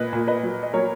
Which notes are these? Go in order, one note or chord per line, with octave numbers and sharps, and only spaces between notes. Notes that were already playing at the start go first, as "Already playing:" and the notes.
Already playing: A#2 B4 D#5
A#2
B4 D#5
F#3
D#5
F#3 A#4 C#5